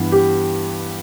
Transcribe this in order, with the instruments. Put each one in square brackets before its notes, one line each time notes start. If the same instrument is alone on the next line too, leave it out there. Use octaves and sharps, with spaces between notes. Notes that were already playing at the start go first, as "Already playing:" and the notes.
Already playing: [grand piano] G2 E3 B3
[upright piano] G4